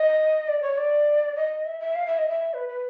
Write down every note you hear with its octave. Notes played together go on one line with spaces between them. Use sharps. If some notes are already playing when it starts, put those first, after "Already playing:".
Already playing: D#5
D5
C#5
D5
D#5
E5
E5
F5
E5
D#5
E5
B4
B4